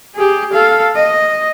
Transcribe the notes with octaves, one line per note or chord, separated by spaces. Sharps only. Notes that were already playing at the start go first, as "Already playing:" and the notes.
G4 G#4
A4 F5
D#5